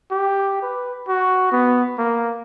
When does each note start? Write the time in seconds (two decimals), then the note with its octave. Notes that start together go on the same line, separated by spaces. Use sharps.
0.11 G4
0.62 B4
1.08 F#4
1.52 B3
1.98 A#3